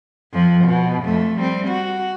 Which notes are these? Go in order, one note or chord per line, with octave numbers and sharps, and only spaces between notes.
F2 F3
B2
F2 A3
G3 C4
F#4